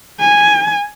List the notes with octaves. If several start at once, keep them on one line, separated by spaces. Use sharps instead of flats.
G#5